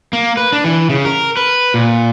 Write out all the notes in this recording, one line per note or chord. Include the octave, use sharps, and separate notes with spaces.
A#3
B4
D4
E3
C#3
A#4
B4
A#2